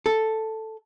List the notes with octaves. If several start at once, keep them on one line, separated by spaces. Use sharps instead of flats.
A4